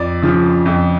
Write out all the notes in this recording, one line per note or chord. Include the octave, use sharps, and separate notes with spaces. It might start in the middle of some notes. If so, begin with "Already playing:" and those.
Already playing: F2 D5
C#3 F3
F2